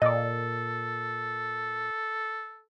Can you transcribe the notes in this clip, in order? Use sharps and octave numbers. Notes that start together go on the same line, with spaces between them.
A#2 A4 D5 D#5